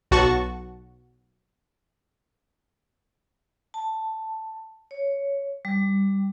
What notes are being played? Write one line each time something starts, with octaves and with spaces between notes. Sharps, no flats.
B1 F#4 A5 C#6
A5
C#5
G3